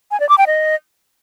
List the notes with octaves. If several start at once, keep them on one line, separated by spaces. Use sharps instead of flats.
G#5
D5
D6
G5
D#5